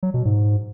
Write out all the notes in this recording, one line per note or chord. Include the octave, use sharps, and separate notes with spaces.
F#3
B2
G#2